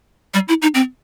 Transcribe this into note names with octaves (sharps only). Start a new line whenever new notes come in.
G3
E4
D#4
C4